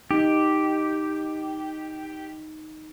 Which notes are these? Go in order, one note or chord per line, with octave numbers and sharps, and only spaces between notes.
D#4 G4